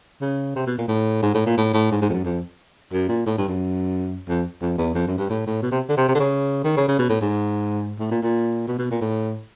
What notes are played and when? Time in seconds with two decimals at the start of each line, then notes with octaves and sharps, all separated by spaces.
0.21 C#3
0.56 C3
0.67 B2
0.78 A#2
0.88 A2
1.22 G#2
1.34 A2
1.46 A#2
1.57 A2
1.73 A2
1.91 G#2
2.02 G#2
2.09 F2
2.13 F#2
2.25 F2
2.93 F#2
3.09 A#2
3.26 A2
3.38 G2
3.48 F#2
4.28 F2
4.62 F2
4.78 E2
4.95 F2
5.07 F#2
5.18 G2
5.29 A2
5.46 A2
5.62 B2
5.71 C3
5.89 D3
5.97 C3
6.08 C3
6.15 D3
6.20 C#3
6.64 D#3
6.77 C#3
6.88 C#3
6.99 B2
7.09 A2
7.21 G#2
8.00 A2
8.11 A#2
8.23 A#2
8.68 B2
8.79 B2
8.91 A#2
9.01 A2